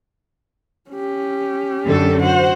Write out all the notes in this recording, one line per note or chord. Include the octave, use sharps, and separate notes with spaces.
C#4 G4
F#2 D3 A4
F#4 C5 F#5